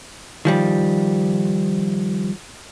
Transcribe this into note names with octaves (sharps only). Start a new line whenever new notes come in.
D#3 F3 G3